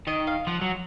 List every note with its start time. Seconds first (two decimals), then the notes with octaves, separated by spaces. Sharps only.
0.07 D#3 D#5
0.27 F5
0.47 F3 F#5
0.61 F#3